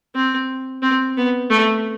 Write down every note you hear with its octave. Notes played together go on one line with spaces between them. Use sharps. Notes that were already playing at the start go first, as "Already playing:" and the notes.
C4
C4
B3
A3